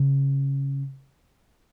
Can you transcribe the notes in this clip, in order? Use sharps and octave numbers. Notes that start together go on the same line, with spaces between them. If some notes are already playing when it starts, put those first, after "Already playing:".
Already playing: C#3